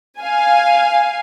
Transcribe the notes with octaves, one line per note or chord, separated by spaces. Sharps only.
F5 G#5